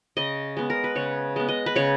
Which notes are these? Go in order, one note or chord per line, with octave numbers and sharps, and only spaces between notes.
C#3 D#5
G#3 B3
A#4
B4
C#3 C#5
G#3 B3
D#5
B4
C#3 C#5